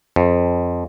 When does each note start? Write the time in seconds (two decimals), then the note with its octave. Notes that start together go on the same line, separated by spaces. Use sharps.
0.16 F2